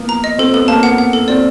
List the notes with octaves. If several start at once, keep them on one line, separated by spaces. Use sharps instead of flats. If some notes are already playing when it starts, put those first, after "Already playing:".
Already playing: F3 A#3 B3
A#5
D#5
C4 A4
B3 A4
A#3 A5
B3 F#5
F#5
A4
C4 D5